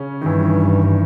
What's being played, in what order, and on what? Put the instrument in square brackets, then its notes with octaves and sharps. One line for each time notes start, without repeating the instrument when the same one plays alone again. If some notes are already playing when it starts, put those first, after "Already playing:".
Already playing: [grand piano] C#3 C#4
D#3
[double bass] G2 [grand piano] E3